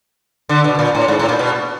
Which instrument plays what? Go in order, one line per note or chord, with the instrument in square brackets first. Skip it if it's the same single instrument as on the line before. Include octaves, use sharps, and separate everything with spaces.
[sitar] D3
B2
A#2
A2
G#2
A2
A#2
B2